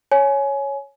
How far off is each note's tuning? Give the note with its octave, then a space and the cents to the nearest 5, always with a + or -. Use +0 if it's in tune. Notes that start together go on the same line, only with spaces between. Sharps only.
C#5 +0 G#5 +20